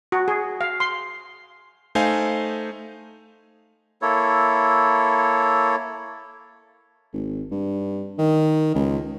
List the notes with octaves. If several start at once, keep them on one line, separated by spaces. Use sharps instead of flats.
F#4
G#4
F5
C6
A3 D#4 C5 F5 G#5
A#3 E4 A4 C#5
G#1
G2
D#3
C#2